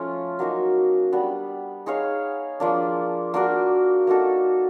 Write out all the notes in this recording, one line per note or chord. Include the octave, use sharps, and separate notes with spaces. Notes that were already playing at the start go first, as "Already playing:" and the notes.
Already playing: F3 A3 C#4 F4
F#3 A#3 D#4 F#4
G3 B3 D4
D#4 G#4 C#5 F5
F3 A#3 D4
A#3 D4 F#4 A#4
A#3 D#4 F#4 A4